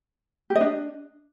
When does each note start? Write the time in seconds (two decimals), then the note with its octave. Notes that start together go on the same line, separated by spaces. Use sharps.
0.50 G4
0.55 D#5
0.61 D4